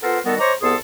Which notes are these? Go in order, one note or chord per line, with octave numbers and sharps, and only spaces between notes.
B3 F4 A4 A#4 C5 F#5
D#3 G3 B3 F#4 A4 A#4
C5 C#5 D#5 A#5 C#6 D6
C2 B3 G#4 A4 C6 D#6